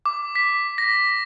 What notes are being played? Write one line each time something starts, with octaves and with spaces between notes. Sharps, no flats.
D6
B6
A#6